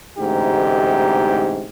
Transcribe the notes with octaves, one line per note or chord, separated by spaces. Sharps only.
A1 D2 G#2 C3 D#4 G4